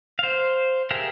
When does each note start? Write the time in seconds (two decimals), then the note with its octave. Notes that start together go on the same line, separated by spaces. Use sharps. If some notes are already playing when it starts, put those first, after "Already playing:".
0.19 C5 F5
0.91 G4 G#4 A#4 E5 F5